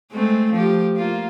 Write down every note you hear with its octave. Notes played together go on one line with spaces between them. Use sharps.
G#3 A3 C4
F3 G4
A#3 F4